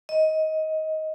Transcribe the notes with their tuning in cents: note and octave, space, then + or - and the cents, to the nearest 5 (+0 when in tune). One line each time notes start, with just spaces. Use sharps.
D#5 +20